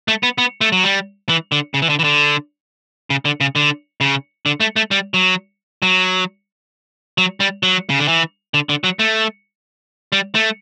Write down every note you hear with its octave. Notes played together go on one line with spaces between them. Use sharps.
A3
B3
B3
A3
F#3
G3
E3
D3
C#3
E3
D3
E3
D3
C#3
D3
C#3
D3
C#3
D3
A3
A3
G3
F#3
F#3
F#3
G3
F#3
C#3
D3
E3
D3
D3
F#3
A3
G3
A3